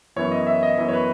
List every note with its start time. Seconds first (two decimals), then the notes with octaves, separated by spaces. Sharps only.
0.16 F#2 E3 B3 E4 C#5
0.32 D#5
0.47 E5
0.63 D#5
0.78 F#2 E3 B3 E4 D#5
0.89 C#5
0.93 B4